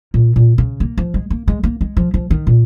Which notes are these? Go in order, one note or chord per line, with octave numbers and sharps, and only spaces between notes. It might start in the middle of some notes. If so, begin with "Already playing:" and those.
A#2
A#2
C#3
A#3
F3
G#3
A#3
G#3
A#3
G#3
F3
F3
D#3
A#2